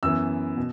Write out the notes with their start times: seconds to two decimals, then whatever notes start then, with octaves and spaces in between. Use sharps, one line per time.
0.03 F#2 E3 B3 E6
0.57 B2